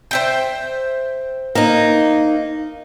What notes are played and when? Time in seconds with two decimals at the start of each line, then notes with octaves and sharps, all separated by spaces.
0.11 C5 E5 G5
1.55 A#3 D#4